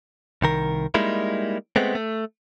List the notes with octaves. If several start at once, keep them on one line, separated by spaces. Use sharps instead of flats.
C2 D#3 A#4
G3 G#3 A#3 D#4 E4
G#3 A3 B3 C4
A3